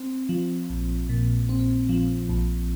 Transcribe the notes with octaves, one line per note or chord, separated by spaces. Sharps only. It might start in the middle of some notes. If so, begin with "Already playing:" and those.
Already playing: C4
F3
A#1
A#2
C4
F3
A#1